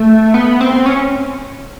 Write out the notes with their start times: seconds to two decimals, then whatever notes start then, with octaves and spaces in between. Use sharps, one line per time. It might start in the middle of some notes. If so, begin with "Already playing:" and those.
Already playing: A3
0.34 B3
0.61 C4
0.86 C#4